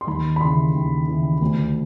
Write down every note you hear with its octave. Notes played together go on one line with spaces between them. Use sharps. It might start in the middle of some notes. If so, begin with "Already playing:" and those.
C6
D#2 B5
B5
C#3 E3 C6
D#2
C#3 E3
D2